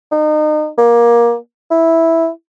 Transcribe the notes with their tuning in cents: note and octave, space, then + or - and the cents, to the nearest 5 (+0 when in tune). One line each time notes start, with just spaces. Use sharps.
D#4 -35
A#3 +20
E4 -5